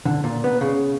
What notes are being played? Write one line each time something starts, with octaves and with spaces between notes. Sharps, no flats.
D3
A#2
B3
C#3